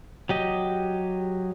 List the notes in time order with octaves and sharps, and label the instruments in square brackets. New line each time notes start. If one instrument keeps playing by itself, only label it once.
[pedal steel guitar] F#3 G4 D#5